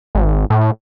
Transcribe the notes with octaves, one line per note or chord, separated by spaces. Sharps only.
G#1
A2